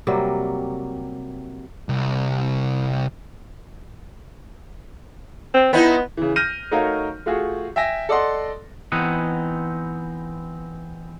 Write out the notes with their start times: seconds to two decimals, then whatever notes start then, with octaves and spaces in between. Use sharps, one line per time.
0.07 C3 F#3 G3 A#3
1.89 C2
5.54 C4
5.73 B3 C4 D#4 E4
6.17 C#3 E3
6.36 F6 G6 A#6 D#7
6.71 A3 D#4 F#4 A#4 C#5 F5
7.26 A3 F4 F#4 G#4
7.76 E5 G5 G#5 A#6
8.09 A4 D5 D#5 F#5 C6
8.92 E3 B3 C4 D#4 D#5 F#5